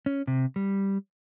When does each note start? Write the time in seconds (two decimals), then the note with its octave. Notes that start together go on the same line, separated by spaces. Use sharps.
0.06 C#4
0.27 C3
0.56 G3